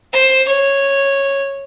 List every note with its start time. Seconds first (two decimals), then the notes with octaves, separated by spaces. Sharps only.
0.13 C5
0.48 C#5